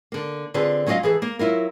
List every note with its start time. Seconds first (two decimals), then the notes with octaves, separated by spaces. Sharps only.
0.12 D3 A#3
0.54 D3 C4 F4 G#4 B4
0.86 F#3 C#4 F4 D5 D#5 F5
1.03 E3 G#4 A4
1.22 A#3
1.39 F#3 E4 F4 A#4